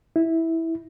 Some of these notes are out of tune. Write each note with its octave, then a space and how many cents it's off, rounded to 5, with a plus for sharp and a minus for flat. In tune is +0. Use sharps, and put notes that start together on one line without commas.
E4 -10